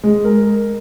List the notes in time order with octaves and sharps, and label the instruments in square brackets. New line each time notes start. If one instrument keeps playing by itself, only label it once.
[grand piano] G#3
A#4